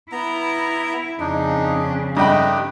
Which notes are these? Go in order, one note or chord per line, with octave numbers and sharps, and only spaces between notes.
B3 E4 A#5
F2 C#3 D4 D#4
G2 A3 D#4 G4 D#5 G5 B5